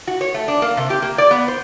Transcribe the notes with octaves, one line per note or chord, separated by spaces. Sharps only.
F#4
C#5
A3
D4
A#3
C3
G4
A#3
D5
B3
C5